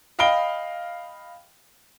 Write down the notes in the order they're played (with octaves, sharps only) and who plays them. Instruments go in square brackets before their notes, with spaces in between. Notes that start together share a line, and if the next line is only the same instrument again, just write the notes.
[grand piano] D#5 F5 G5 B5 D7 G7